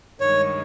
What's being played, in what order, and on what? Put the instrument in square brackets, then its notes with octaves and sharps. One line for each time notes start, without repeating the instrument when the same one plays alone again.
[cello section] G2 D#3 G#3 [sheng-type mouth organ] C#5